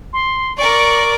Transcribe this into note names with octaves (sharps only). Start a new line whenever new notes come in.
C6
A#4 D5 C#6